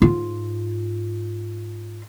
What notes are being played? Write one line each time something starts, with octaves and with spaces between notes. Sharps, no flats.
G#2 F4